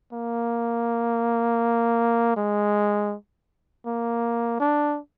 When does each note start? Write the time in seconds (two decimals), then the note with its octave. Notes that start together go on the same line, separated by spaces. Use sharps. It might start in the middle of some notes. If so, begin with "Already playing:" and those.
0.13 A#3
2.37 G#3
3.86 A#3
4.60 D4